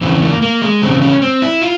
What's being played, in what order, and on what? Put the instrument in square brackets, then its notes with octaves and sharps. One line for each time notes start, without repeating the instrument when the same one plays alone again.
[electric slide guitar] E2 C#3 E3 C4
A#3
A#3
G#3
E2 C#3 C4
C#4
C4
E4
F4